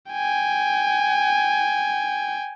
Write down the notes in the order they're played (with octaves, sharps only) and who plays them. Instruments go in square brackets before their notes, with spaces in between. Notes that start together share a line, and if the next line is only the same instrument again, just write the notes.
[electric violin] G5 G#5